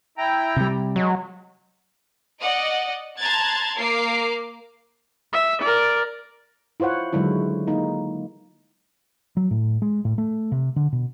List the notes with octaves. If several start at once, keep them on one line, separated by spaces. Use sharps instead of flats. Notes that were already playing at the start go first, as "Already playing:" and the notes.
E4 G5 A#5
C3 G3
F#3 G#3
D5 D#5 F#5
A5 A#5 C6 F#6 G#6 A6
A#3 A#4 D6 C7
E5
A#4 D5
E4 F4 C5 C#5 F#5
D3 D#3 F#3 G#3 E4
A#3 D#4
F#3
A2
G#3
A2
A3
C3
D3
B2